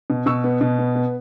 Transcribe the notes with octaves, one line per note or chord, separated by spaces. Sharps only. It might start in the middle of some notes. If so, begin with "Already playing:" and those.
B2
B2 C#6 E6
B3
B2
B3
B3